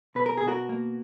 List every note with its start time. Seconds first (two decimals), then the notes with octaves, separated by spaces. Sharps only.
0.15 B2 B4
0.26 A#4
0.37 B2 G#4
0.48 F#4 A#4
0.69 A#3